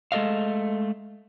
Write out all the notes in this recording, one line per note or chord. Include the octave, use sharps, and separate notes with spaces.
G#3 A3 A4 C#5 D#5 F5